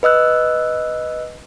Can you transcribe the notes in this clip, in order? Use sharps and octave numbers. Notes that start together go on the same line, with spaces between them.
B4 D#5 E6 F#6